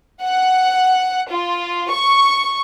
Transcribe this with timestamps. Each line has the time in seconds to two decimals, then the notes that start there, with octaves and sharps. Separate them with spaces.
0.22 F#5
1.29 F4
1.92 C#6